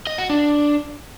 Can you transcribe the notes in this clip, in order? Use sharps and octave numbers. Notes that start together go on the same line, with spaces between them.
D#5
F#4
D4